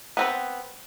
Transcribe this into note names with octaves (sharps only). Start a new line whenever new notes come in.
B3 C4 B4